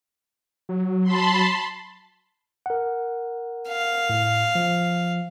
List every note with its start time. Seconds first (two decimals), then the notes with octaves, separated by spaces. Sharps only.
0.69 F#3
1.03 A5 B5 C6
2.66 A#4 F#5
3.69 F5
4.10 A2
4.55 F3